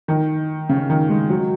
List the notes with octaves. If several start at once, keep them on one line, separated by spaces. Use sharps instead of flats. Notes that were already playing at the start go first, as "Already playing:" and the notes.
D#3
C#3
D#3
G#3
F#3